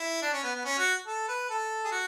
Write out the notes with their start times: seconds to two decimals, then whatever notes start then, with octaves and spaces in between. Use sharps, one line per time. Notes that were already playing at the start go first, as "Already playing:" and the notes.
Already playing: E4
0.22 D4
0.33 C#4
0.43 B3
0.55 B3
0.65 C#4
0.78 F#4
1.07 A4
1.28 B4
1.49 A4
1.85 G#4
1.92 F#4